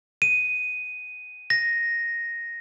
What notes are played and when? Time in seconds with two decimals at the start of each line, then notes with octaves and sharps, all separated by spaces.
0.22 D#7
1.50 A#6